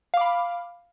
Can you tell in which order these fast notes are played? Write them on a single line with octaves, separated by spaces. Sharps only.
F5 D6 B5